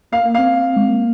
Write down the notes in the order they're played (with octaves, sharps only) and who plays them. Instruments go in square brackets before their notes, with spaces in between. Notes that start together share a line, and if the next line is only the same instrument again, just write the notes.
[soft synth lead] A#3 [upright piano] F5
[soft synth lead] A#3
[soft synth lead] C4 [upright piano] F5
[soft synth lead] G#3
A#3